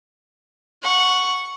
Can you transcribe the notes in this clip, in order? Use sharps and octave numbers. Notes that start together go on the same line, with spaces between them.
F#5 C#6